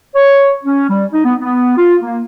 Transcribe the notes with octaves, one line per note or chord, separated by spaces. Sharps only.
C#5
C#4
G3
D#4
B3
B3
F4
A#3